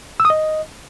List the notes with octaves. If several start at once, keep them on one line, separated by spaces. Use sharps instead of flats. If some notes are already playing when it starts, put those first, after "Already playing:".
E6
D#6
D#5